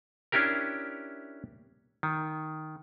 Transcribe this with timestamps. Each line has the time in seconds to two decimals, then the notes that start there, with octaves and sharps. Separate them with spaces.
0.32 C#4 D4 E4 G4 A#4
2.03 D#3